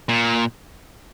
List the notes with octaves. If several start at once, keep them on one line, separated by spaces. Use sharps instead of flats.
A#2